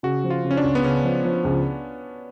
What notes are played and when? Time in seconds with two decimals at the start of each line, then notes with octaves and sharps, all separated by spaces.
0.03 C#3 F#4
0.24 F3
0.30 F4
0.44 C#3
0.51 C#4
0.57 D4
0.64 C#2
0.75 B3
0.84 C#3 C#4
1.04 F3
1.25 F3
1.44 C#2